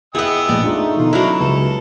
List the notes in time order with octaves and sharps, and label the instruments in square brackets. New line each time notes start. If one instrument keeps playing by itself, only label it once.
[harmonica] B3 G5 E6 [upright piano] E4 E5 [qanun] G#4 F#5 [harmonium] D#5
[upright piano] A#1 A2 [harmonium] D4 D#5 [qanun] D5
[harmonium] A3 D#4 [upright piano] D4 F4 G#4
[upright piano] B2 D3 D#3 [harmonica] F4
[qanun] F#3 E4 [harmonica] A#3 D4 [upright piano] C#4
[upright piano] C#2 [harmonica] A4